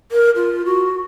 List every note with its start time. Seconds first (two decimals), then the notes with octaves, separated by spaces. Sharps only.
0.12 A#4
0.36 F4
0.66 F#4